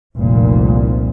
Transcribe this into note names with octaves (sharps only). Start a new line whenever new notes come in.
F1 C2 A#2